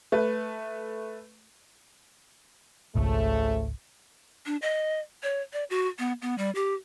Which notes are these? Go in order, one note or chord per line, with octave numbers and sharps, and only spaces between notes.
A3 B4
G#1 C#2 C#3 F3 A3
D4
D#5
C#5
D5
F#4
B3
B3
G3
G4